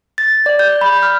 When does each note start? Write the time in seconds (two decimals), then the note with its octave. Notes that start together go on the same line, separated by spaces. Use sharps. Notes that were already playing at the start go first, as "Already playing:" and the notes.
0.18 A6
0.46 D5
0.59 G6
0.81 B5
1.03 F6